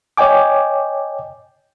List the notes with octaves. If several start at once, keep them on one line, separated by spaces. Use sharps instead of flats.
C#5 D#5 G5 G#5 D6